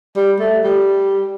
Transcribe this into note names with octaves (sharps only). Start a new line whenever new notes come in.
G3
A3
G3